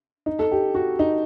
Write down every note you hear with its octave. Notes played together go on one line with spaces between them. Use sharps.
D#4
A4
G4
F#4
D#4